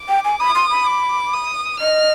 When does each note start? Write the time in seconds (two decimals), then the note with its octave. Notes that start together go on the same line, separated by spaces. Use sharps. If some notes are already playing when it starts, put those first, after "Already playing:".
Already playing: D6
0.09 G5
0.25 G#5
0.40 B5 D#6
0.55 C6
0.71 B5
0.87 D6
1.34 D#6
1.81 D#5 F6